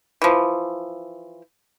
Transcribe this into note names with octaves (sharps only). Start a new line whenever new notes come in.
E3 F3